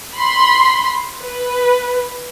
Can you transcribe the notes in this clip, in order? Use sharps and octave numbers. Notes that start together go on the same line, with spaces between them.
B5 C6
B4